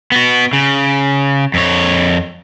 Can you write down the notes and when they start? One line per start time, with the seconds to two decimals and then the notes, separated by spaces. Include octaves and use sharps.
0.12 B3 F#4
0.53 C#3
1.54 F2 C#5